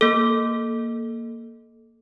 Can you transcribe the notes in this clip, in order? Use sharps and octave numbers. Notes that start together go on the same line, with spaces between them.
A#3 A4